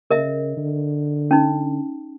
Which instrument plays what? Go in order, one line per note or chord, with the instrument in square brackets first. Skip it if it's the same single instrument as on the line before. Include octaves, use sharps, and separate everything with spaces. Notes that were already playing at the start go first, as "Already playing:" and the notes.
[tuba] C#3 [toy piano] A#4 D#5 E5
[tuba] D3
[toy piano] C#4 D#4